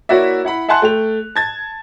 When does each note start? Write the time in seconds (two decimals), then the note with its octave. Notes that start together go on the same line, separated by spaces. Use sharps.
0.09 A#3 E4 F#4 C#5 D5 E5
0.45 E4 F#5 B5
0.69 E5 F#5 G#5 A5 C6 F#6
0.82 A3 G5 F7
1.36 A5 G#6 A6